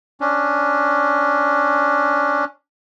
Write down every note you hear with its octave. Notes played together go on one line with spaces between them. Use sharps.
C#4 D4